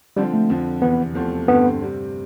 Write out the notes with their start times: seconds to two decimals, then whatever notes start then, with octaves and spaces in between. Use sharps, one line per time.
0.17 D3 F3 G3 C4
0.34 A3
0.49 F2 D3 F3
0.82 E2 C3 E3 B3
1.15 E2 C3 F3 A3 C4
1.48 G2 D3 A3 B3 C4
1.81 C3 G3 C4